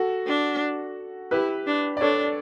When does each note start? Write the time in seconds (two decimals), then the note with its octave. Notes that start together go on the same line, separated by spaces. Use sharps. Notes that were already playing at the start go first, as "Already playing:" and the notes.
Already playing: F#4 A4
0.27 D4
1.31 E4 G4 B4
1.67 D4
1.97 D5
2.01 D4 A4 C#5